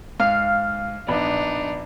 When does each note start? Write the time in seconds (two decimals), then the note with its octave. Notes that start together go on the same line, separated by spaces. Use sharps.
0.20 G#2 F5
1.08 A#1 B3 D4 D#4 B5